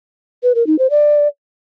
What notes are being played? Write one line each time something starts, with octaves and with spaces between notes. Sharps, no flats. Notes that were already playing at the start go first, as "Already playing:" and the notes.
B4
A#4
D#4
C5
D5